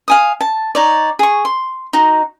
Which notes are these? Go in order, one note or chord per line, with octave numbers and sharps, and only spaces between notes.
F5 G#5 D#6
A5
D#4 C#5 D5
G#4 C#6
C6
D#4 F#4